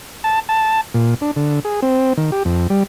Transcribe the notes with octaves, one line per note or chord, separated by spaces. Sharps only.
A5
A5
A#2
D4
D3
G#4
C4
D#3
G4
F2
G3